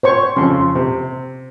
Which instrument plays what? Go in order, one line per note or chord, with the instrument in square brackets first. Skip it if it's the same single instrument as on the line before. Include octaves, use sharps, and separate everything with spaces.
[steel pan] C5 C#5 C#6
[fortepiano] F2 C#3 [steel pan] C6
[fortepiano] C3